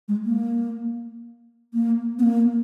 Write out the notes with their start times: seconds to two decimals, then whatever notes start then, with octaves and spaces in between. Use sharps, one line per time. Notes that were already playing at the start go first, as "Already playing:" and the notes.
0.08 G#3
0.25 A#3
1.74 A#3
2.19 B3
2.23 A#3